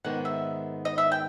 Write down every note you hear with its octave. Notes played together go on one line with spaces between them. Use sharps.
G#2 D#3 G#3 B3 F#5
E5
D#5
E5
G5